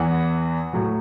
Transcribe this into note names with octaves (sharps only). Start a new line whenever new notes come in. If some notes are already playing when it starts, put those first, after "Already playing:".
Already playing: E2 E3 F#5
A2 F#3